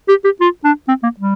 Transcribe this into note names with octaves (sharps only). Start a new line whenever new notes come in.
G4
G4
F4
D4
C4
A#3
G3